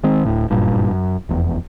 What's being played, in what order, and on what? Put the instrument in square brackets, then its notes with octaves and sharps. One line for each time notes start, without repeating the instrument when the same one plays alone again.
[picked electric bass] D#3 G#3 C4
D1 G#1 A2
F#1 G2 A#2
F#2
F1 E2